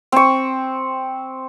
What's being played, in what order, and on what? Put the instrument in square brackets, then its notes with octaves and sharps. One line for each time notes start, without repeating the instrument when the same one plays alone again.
[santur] C4 C#6